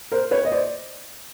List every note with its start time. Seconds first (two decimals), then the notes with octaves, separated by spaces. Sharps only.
0.12 A#4 C5
0.31 B4 C#5
0.45 D#5
0.52 C5 D5